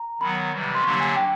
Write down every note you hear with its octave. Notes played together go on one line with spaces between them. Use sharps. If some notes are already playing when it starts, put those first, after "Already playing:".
Already playing: A#5
D#3 F#3 B3 B5
C3 E3 G3
C6
D3 F#3 A#3 D4 G4 C#6
G#5
G5